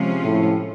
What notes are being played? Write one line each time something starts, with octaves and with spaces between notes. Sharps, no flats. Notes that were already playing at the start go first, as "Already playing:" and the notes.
Already playing: C3 F3 G#3 C#4 F4
A2